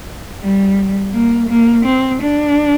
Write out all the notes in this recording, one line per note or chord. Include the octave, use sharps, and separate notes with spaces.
G3
A#3
A#3
C4
D4